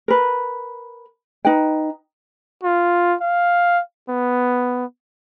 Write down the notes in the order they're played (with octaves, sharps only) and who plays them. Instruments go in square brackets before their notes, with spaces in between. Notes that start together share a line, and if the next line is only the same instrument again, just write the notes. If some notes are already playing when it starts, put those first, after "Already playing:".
[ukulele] A#4 B4
D#4 B4 G5
[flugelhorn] F4
F5
B3